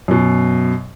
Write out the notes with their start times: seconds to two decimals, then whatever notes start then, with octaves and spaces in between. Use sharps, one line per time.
0.08 F#2 B2